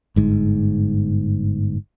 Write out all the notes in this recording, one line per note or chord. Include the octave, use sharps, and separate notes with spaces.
G1 G#2